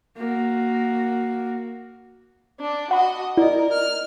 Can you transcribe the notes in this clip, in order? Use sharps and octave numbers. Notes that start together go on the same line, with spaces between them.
A#3 F#4
D4
F#4 D#5 F#5 B5
E4 A#4 D5 D#5
F6